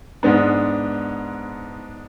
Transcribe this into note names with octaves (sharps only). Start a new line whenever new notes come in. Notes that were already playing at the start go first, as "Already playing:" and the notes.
G#2 G#3 B3 D4